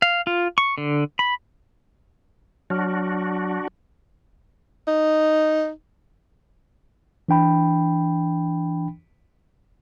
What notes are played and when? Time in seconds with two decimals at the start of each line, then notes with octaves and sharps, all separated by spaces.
0.02 F5
0.27 F4
0.58 C#6
0.78 D3
1.19 B5
2.70 F#3 D4 F#4 F6
4.87 D#4
7.29 E3 D4 G5 B5